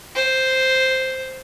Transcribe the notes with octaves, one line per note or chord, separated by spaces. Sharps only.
C5